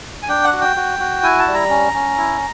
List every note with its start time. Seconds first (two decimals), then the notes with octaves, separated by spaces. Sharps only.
0.23 G#5
0.29 D4 G5
0.44 F#5
0.52 F#4
0.61 G5
0.76 F#4
0.99 F#4
1.23 E4 G#5
1.39 A5
1.47 G3
1.54 A#5
1.70 C#4
1.94 C#4
2.18 E4